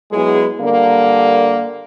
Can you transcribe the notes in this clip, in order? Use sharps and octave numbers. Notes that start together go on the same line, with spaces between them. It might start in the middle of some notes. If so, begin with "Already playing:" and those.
F#3 G#3 B3 E4 G#4
D3 G3 A#3